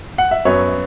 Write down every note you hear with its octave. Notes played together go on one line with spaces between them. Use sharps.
F#5
E5
F#2 F#3 B3 C#5